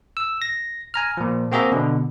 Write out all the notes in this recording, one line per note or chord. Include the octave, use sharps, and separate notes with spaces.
E6
A#6
G#5 A#5 F6
A#2 F3
A#3 C4 F#4 G#4 E5 A#5
B2 D3